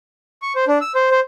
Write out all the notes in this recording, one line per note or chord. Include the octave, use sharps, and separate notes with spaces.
C#6
C5
D4
E6
C5
C5